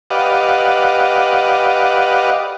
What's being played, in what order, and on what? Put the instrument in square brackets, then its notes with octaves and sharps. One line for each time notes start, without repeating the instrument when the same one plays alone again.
[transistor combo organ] G4 B4 D5 D#5 F5 F#5